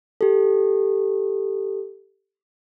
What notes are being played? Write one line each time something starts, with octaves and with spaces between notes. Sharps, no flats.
G4 A4